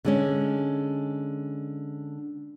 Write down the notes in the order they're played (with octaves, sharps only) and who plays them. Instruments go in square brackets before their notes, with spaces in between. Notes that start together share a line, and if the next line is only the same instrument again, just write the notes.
[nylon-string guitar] D3 G#3 C#4